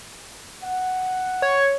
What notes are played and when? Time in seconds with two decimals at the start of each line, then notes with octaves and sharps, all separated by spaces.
0.63 F#5
1.42 C#5